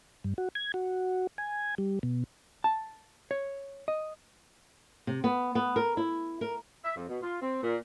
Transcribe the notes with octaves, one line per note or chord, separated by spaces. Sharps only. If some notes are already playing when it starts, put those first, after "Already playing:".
G2
F#4
G#6
F#4
G#5
G3
B2
A5
C#5
D#5
C3
B3
B3
A#4
E4
A#4
E5
F2
B2
F4
C4
A#2